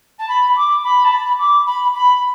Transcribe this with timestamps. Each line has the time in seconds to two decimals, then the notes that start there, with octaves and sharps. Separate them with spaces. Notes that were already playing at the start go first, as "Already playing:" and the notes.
0.18 A5
0.28 B5
0.56 D6
0.83 B5
1.04 A5
1.11 B5
1.39 D6
1.66 B5
1.94 B5